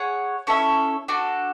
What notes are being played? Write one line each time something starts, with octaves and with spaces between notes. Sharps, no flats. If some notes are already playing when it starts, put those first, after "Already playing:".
Already playing: G#4 C#5 F#5
C#4 E4 A4 E5
D4 F#4 A4